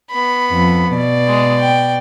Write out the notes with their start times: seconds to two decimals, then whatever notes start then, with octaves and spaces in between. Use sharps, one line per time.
0.11 B3 B5
0.50 F2
0.94 B2 D5
1.27 G#3
1.60 G5